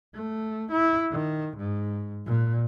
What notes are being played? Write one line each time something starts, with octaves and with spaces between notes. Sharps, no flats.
A3
E4
D#3
G#2
A#2